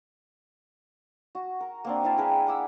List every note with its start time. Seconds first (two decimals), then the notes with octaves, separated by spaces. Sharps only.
1.35 F#4
1.60 A#4
1.84 A#3 C4 D4
2.04 C4 E4 F5 A5
2.17 G#4 A#4 B4 G5
2.47 F#5 D6 E6